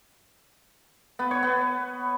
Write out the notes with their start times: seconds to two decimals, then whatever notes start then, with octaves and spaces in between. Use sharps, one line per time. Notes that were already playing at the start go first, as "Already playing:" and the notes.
1.19 B3
1.31 C#5
1.43 B3